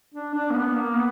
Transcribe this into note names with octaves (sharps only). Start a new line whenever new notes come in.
D4
D4
A#3
B3
A#3
B3